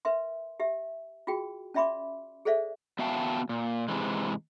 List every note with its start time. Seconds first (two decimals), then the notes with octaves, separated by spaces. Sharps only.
0.05 A#4 B4 E5 C6
0.60 G4 E5
1.27 F4 F#4 G#4 G5
1.74 C#4 D5 E5 B5 C6 D6
2.45 G#4 A4 C5 D5 E5 F5
2.99 B3 F#4 E5 F5 G5 A5
3.49 A#2
3.88 G#2 C3 E3 G#3